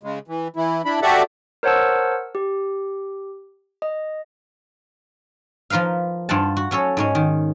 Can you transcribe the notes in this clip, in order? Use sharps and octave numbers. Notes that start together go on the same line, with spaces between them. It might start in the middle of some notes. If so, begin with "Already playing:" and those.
C#3 G#3
E3
E3 E4
D4 E4 B5
F#4 G4 A4 D5 E5 F#5
A#4 C5 C#5 F#5 A5 E6
G4
D#5
F3 F4 A#4 B4 F5
G2 F4 C5 F#5 A5
F#4
F#3 C#4 A4 C#5
G#2 G#3 C#4
D#3